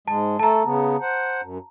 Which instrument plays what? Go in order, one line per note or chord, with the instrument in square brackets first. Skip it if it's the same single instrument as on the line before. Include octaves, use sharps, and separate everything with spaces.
[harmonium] G#2 G#3 [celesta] A5
[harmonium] A3 A4 [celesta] A5 A#5
[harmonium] C#3 B3
C5 F#5
F#2